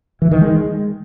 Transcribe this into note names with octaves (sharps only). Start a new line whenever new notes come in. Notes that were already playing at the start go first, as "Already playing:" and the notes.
E3
D#3
G#3